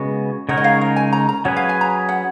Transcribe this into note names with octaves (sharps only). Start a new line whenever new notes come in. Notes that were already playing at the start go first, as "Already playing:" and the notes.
Already playing: C#3 G#3 B3 F#4
C#3 G#3 D#4 A#4 C#5 F#5
D#5
F5
F5
G#5
A#5
A#5
F#3 C#4 G#4 B4 F#5
F5
G#5
A#5
F#5